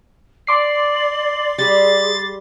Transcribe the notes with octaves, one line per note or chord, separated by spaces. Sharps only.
D5 C6 D6 C7
G3 G#4 A6